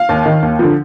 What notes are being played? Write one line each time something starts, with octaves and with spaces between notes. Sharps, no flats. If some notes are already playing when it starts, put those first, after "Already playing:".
Already playing: F5
D#2
D#3
D#2
D3 F3